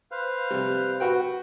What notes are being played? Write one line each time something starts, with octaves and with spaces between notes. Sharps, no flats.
B4 C5 F5
C3 G3
F#4 B4 G5